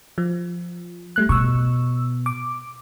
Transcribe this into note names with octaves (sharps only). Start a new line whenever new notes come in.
F3
G3 A3 F#6
B2 C#6 E6
D6